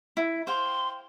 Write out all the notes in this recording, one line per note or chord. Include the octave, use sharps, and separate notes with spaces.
E4
C5 F5 G5 C6